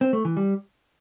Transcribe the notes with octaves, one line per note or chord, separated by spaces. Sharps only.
C4
A3
E3
G3